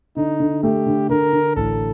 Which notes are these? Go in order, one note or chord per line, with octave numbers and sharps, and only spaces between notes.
D3 D#4
D3
A3 G4
D3
D3 A#4
D3
A1 A4